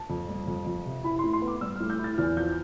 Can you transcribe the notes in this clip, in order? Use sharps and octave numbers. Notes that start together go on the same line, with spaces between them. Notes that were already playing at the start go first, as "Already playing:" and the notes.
Already playing: A5
F2
G3
F2
F2
C3
E4 B5
A2 C6
C6
B3
D6
G3 E6
A2 F6
G6
E4
A6
E2 F6
F3 G6